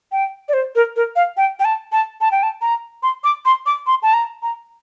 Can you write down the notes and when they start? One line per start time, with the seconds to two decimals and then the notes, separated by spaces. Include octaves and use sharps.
0.12 G5
0.49 D5
0.53 C5
0.75 A#4
0.96 A#4
1.16 F5
1.37 G5
1.60 G5
1.65 A5
1.92 A5
2.21 A5
2.31 G5
2.43 A5
2.61 A#5
3.03 C6
3.24 D6
3.45 C6
3.66 D6
3.87 C6
4.03 A5
4.14 A#5
4.43 A#5